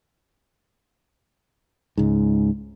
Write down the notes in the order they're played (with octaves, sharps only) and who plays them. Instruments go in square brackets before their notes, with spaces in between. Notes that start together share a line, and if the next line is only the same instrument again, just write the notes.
[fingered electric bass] C#2 G#2